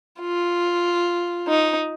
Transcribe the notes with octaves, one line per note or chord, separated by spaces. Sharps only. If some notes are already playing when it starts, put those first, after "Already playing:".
F4
D#4